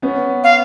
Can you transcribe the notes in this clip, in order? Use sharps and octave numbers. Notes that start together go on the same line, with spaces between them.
B3 C#4
F5